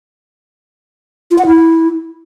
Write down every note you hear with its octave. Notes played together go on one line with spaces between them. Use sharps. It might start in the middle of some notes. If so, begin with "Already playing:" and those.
F4
F#5
E4